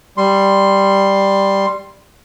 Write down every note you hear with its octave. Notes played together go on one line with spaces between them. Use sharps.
G3 C6